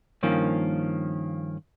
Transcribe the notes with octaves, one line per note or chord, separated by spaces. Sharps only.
G2 D#3 F3 A#3 C#4